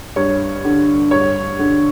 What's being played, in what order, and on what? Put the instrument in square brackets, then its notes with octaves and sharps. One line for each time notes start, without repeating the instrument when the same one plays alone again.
[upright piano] G2 C#5
D3
G2 C#5
D3